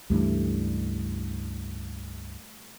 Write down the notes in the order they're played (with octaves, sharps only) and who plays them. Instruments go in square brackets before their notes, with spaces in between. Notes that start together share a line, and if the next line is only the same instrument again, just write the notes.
[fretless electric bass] C#2 G2 E3 [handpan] G3 A3 D4